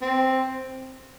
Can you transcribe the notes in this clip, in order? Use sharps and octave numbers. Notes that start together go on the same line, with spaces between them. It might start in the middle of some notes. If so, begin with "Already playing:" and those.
C4